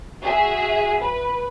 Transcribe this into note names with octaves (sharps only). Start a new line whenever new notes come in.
F#4 G#4 E5
B4